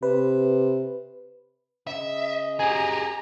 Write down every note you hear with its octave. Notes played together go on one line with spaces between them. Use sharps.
C3 B4
C#3 D#5 E5
G4 G#4 G#5 A#5